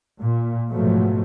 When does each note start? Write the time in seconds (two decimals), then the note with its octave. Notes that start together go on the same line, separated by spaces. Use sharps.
0.20 A#2
0.71 G#2 B2 F3 F#3 A3